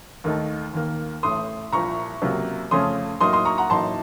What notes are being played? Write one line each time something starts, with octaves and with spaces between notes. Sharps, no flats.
D#2 D#3 A3 D#4
D#2 D#3 A#3
A1 A2 A3 C6 D#6
C2 A#2 F3 A#5 C#6
C#2 C3 F#3 A#3
F2 C#3 A3 C#4 C6 D#6
A2 F#3 A#3 D#4 C6 D#6
C6 D#6
A#5 C#6
F#5 A#5
A1 A2 F#3 A#3 D#4 A5 C6